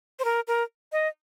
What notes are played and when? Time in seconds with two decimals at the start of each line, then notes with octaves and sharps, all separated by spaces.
0.19 C5
0.25 A#4
0.47 A#4
0.92 D#5